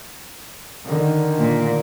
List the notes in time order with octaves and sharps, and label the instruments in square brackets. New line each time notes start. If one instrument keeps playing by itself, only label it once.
[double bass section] D3 D#3
[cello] A#2